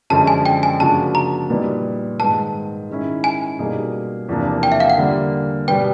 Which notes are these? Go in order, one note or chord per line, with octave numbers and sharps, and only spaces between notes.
F#2 D3 F3 G#3 C#4 A5
G#5
G5
G#5
C#3 F3 A#3 D4 F#4 A5
A#5
A#2 G3 B3 D#4
G#2 D#3 G#3 B3 A5
D#3 G#3 C#4 E4
G#5
B2 G3 A#3 D#4 G#4
E2 C3 F3 A#3 D4
G5
E5
F5
F#5
D3 G3 A#3
B2 G3 B3 G5